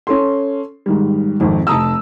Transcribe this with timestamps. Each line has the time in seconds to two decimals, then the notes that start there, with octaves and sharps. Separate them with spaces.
0.07 C#4 A4 C6
0.86 G#2 D#3 G3
1.40 G#1 F2 D#3
1.67 F1 A5 A#5 D#6 E6